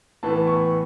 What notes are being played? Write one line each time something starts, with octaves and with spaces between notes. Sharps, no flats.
A2 E3 B3 A5
C#6